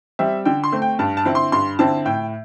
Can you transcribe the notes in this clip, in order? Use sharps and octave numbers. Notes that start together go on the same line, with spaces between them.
G3 C4 E5
D3 G5
C6
A3 C4
G5
G2 A5
A5
D3 C4 E4
C6
G2 C6
D3 C4 E4 A5
A2 G5